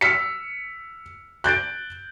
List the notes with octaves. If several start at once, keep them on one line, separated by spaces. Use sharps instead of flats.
E6 F6 B6 C#7
F#6 G6 A6 D7